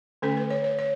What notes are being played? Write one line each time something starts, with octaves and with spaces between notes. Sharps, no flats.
D3 A3 C#4 A4
B4
C#5
C#5
C#5